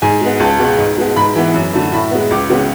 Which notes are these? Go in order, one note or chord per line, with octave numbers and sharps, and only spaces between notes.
G#2 G#5
G#3 B3
C#2 A5
B2 G#3 B3
G#2
G#3 B3
G#2 B5
E3 B3
F#2
D3 A3
A2 B5
G#3 B3
C#2 D6
C#3 G#3 B3